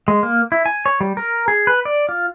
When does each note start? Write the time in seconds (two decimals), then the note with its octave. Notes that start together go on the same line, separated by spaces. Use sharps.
0.08 G#3
0.23 A#3
0.52 E4
0.66 G#5
0.86 C#5
1.01 G3
1.17 A#4
1.48 G#4
1.67 B4
1.85 D5
2.09 F4